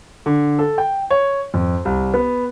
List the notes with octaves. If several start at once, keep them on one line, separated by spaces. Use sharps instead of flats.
D3
A4
G5
C#5
F2
C2
B3